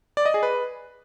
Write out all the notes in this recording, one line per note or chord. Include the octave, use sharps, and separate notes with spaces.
D5
D#5
G#4
B4